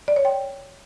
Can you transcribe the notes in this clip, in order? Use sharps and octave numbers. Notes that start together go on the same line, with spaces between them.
D5
C#5
G5